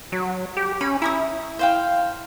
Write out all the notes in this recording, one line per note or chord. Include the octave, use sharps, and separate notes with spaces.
F#3
G4
C#4 B5
E4 A#5 C#6 D#6
C5 F5 G5